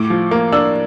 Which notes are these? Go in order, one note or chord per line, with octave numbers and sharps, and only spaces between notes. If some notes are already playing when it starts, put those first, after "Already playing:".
Already playing: A2 D6
F3
A#3
D4 E6